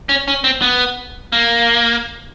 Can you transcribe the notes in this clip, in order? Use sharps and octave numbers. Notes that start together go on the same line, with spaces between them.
C#4
C#4
C4
B3
A#3